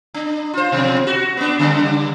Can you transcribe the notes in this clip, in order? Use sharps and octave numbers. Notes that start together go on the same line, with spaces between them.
D4
F4 C5
B2 D#3 F3
F#4
B3 D4
C#3 G3